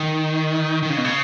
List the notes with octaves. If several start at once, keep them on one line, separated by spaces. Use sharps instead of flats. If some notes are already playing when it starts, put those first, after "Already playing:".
Already playing: D#3
D#3
C#3
B2
C#3